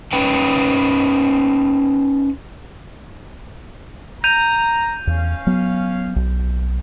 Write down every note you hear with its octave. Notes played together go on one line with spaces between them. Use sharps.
C#4 D#4 B4 G5
A#5 G6 D#7 F7
E2 C#4 F5
F#3 B3
B1